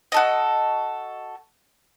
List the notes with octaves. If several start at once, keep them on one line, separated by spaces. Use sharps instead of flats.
F#4 A4 D#5